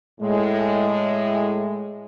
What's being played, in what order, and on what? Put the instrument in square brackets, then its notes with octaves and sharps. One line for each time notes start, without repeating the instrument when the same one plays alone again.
[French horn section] A2 G#3